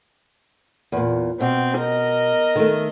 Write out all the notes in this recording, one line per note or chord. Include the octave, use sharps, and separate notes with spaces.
E2 A#2
B2 C4
A#4 D#5
D#3 A3